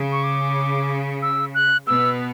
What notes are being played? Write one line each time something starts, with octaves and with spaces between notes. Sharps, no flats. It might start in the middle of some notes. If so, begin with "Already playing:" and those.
Already playing: C#3
C#6
D6
E6
F#6
B2 B3 E6